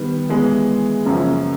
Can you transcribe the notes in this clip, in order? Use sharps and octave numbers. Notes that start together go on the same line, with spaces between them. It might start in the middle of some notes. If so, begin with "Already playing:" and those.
Already playing: D#3 G3 B3
E3 G#3 B3
F#2 C#3 F3 A#3 C#4